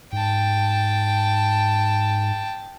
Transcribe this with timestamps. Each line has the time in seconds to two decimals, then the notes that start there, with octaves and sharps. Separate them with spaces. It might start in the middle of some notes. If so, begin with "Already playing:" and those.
0.12 G#2 G5 A5